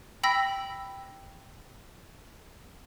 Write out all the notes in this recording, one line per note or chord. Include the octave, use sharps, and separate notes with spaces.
G5 B5 E6 A#6 B6